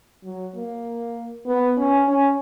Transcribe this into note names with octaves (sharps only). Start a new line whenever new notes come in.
F#3
A#3
B3
C#4
C#4